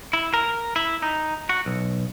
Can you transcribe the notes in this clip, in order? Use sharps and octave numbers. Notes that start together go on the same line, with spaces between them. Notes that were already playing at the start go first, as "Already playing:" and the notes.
E4
A#4
E4
D#4
F#4
B1